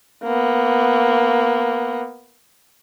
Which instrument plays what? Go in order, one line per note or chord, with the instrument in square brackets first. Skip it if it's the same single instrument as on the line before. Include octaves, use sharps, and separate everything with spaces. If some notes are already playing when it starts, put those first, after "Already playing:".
[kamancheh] A#3 B3